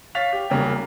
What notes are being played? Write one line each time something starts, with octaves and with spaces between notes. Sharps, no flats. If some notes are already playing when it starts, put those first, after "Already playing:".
C#5 F5 A6 B6 F7
G4
E1 C2 C#3 A#3 G5